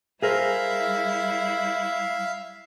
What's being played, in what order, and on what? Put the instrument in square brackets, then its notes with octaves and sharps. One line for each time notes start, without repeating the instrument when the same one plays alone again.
[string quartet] G3 E4 [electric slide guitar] G#4 A#4 C5 [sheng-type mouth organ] E5 F5